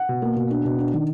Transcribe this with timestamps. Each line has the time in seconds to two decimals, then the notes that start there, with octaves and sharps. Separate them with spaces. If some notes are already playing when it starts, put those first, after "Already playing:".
Already playing: F#5
0.09 B2
0.22 A#3
0.36 B2
0.50 D4
0.65 B2
0.79 D4
0.94 D#3